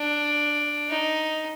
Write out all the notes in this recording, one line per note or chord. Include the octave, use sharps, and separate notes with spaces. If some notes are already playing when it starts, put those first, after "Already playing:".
Already playing: D4
D#4